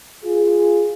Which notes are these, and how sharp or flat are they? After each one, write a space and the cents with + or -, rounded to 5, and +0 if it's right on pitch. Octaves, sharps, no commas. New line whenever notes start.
F4 +0 G#4 +0